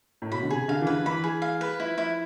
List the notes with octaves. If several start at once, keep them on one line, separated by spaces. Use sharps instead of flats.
A2
B2 B5
D3
C3 G#4
D3 F5
E3
D3 B4
E3 B5
G#4
F5
B4
F3 E4
E4